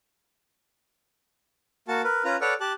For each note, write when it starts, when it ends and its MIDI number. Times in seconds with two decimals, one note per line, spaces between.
1.88 2.02 58
1.88 2.02 66
1.88 2.02 81
2.04 2.23 70
2.04 2.23 71
2.25 2.37 61
2.25 2.37 65
2.25 2.37 71
2.25 2.37 82
2.41 2.54 69
2.41 2.54 71
2.41 2.54 73
2.41 2.54 74
2.41 2.54 78
2.41 2.54 89
2.60 2.73 67
2.60 2.73 81
2.60 2.73 90